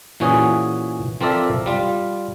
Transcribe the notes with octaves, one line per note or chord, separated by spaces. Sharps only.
A#2 E3 C#4 F#4 G#4
F3 C4 A4 A#4 D5 E5
G3 F4